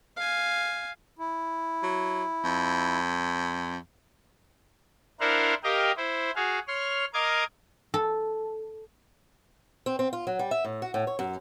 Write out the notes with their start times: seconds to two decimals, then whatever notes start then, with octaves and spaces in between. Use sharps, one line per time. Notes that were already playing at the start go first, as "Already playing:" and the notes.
0.17 F5 G#5
1.19 E4
1.83 F#3
2.44 F2
5.20 D4 E4 A#4 C5 F5 F#5
5.63 G4 A#4 D#5 F5 G5
5.97 E4 C5
6.35 F#4 G#4 F5
6.68 C#5 C6 F6
7.14 A#4 D#5 F5 D6 G#6
7.94 A4
9.86 C4
9.99 C4
10.13 F4
10.27 F#3
10.39 G3
10.51 E5
10.65 A2
10.82 F#4
10.94 A2
11.07 C#5
11.19 F#2